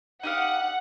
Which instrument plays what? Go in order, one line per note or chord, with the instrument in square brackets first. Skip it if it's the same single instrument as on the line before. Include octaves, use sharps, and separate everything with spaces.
[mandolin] D#4 G4 F5 [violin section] F#5